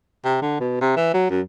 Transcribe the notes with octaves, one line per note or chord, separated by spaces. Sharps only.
C3
D3
B2
C3
E3
F#3
F#2